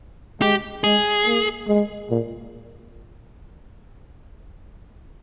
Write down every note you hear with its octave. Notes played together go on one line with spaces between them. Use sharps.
G#3 G4
G#3 G#4
A#3
G#3
A#2